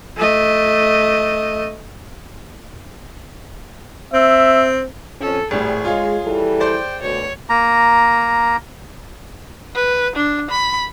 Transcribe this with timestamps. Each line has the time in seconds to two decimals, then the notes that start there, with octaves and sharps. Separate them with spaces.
0.17 A3 D#5
4.14 C4 E5
5.21 F2 C#4 A4
5.51 G#1 A2 G3 G#4
5.85 G#3 F4 C#5 F5
6.24 E3 G3 A4
6.60 C5 D5 G5
7.02 D2 B2 C#5
7.49 A#3 A#5
9.75 B4
10.16 D4
10.51 B5